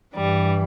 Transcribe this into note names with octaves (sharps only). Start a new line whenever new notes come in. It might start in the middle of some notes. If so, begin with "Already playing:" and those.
G2 E3 G3